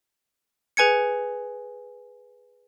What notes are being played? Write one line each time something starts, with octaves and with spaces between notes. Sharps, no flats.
G#4 B4 G#5 G#6 C#7